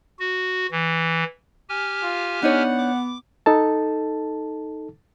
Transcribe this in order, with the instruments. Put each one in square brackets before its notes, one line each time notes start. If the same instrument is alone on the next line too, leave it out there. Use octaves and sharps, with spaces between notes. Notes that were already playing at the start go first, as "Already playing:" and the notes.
[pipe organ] F#4
E3
G4 G#5 F6
[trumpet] F4
[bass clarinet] B3 [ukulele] D4 D#4 C#5 [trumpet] F#5
[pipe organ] D6
[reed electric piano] D#4 A4 A5